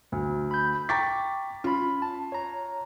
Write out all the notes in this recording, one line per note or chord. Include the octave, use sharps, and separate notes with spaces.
D2
B5 G6
G5 A#5 C#6 D6 A6 B6
C#4 F4 B5
A5
C#5 A#5